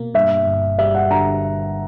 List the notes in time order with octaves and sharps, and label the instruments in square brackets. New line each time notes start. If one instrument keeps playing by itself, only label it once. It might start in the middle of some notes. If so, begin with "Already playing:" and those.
Already playing: [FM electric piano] B2 A#3
[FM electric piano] G2 [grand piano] E5
[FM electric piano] G1
[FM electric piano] G3 [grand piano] E5
[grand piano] F#5
[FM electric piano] D3 [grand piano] A#5